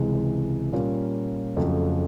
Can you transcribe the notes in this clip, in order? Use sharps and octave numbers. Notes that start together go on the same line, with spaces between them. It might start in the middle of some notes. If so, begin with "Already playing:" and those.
Already playing: C#2 C3 E3 G#3
A#2 G3 A#3 C#4 F4
F2 C#3 F#3 A3 C4